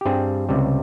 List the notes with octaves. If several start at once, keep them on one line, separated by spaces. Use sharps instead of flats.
G4
G2 G3 C4 G#4
C#2 C3 G3